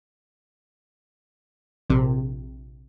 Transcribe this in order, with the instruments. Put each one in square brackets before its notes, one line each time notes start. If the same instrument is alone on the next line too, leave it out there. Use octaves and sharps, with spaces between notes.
[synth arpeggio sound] A#1 C3